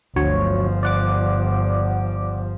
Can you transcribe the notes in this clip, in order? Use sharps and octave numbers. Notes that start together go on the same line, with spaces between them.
G1 D2 F3 F#3 C#5
D5 F#5 D6